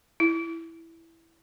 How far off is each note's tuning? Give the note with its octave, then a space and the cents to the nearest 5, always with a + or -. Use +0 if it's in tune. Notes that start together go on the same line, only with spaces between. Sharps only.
E4 +0